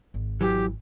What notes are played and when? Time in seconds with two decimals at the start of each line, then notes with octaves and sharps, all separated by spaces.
0.14 G#1
0.41 E3 F#3 G4